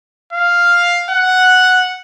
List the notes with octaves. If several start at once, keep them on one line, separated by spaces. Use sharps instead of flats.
F5
F#5